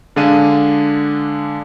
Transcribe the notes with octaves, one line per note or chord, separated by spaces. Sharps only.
D3 G#3 D4 G#4 F5 D#7